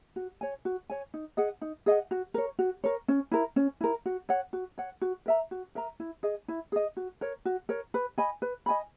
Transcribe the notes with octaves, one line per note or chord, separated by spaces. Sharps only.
F#4
C#5 G#5
F#4
C#5 G#5
D#4
G#4 D#5 F#5
D#4
G#4 D#5 F#5
F#4
A#4 C#5
F#4
A#4 C#5
C#4
E4 A#4
C#4
E4 A#4
F#4
C#5 F#5
F#4
C#5 F#5
F#4
A#4 E5 A#5
F#4
A#4 E5 A#5
E4
G#4 D#5
E4
G#4 D#5
F#4
A#4 C#5
F#4
A#4 C#5
B4
D#5 G#5 B5
B4
D#5 G#5 B5